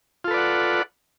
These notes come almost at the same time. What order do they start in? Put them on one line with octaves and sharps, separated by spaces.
F4 A4 B4 D5 F#5